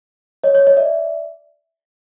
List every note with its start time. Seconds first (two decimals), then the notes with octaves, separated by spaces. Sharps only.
0.44 C#5 D#5
0.55 C#5 D#5
0.67 C#5 D#5
0.77 D5 E5